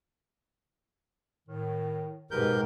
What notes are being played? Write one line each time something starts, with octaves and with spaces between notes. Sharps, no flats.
A2 D#3
G#2 B2 G#3 G4 A#4 B4 G6